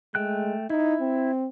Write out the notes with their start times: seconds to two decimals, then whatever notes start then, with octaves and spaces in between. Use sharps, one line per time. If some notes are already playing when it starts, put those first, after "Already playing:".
0.15 G#3 A3 G5 F#6
0.70 D#4 E4
1.01 C4